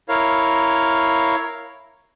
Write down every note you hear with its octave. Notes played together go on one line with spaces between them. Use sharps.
E4 A#4 C#5 F5